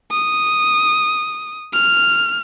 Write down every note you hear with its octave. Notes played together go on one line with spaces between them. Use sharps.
D#6
F6